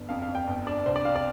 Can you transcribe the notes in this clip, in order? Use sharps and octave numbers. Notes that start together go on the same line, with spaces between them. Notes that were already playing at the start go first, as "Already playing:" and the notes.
Already playing: G1
F2 F5
F5
F2
G5
G1
D4 D5
C2 C5
D5
C4 F5
D5